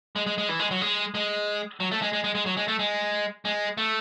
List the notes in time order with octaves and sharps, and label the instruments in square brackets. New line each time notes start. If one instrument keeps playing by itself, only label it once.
[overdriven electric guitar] G#3
G#3
G#3
E3
G#3
F#3
G#3
G#3
F#3
A3
G#3
G#3
G#3
G#3
F#3
G#3
A3
G#3
G#3
A3